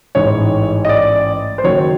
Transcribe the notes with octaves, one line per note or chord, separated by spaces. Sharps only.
A1 G#2 E3 C#5
D#5
D5
C5
F#1 F#2 D#3 F#3 C#5